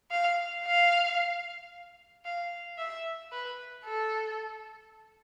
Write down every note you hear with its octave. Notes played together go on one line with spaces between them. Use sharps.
F5
F5
F5
E5
B4
A4